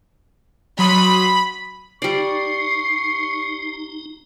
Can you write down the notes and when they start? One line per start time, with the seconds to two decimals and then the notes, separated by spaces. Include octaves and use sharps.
0.79 F#3 B5 C6 D#6
2.02 G3 D#4 D5 C#6 C7